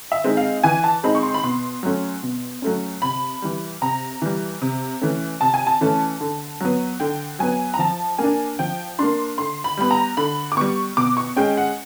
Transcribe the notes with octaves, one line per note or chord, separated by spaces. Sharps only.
E5
G#3 C4 D#4
F5
E3 G#5
A5
G#3 C4 D#4 B5
C#6
C6
B5
B2 C6
F#3 A3 C#4
B2
F#3 A3 C#4
C3 B5
E3 G3
C3 A#5
E3 G3
C3
E3 A3 C#4
C3 A5
G#5
A5
E3 A3 C#4
D3
F#3 B3
D3 G5
F#3 B3 G#5
A#5
F3 A5
A#3 D4 G#5
F3 G5
A#3 D4 C6
D3 C6
B5
G3 B3 B5
A#5
D3 B5
D6
G3 B3 C#6
B2 D6
C#6
G#3 C#4 G5
F#5